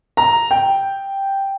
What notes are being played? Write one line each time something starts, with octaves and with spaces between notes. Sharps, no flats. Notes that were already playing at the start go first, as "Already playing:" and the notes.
A#5
G5